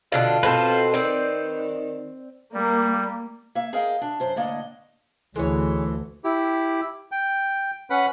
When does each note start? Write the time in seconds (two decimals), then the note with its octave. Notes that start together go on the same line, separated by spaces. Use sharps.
0.12 B2 D3 D4 F4
0.43 B2 C4 A4 B4 C5
0.94 D#3 C4 D5
2.54 G3 A#3
3.55 A#3 E5
3.73 G#4 A#4 D#5 F5 G5
4.02 D4
4.20 F#2 C5
4.36 A2 D3 A#3 D5 D#5
5.36 D2 E3 G#3 C#5
6.24 E4 G4
7.12 G5
7.90 C#4 B4 F#5 B5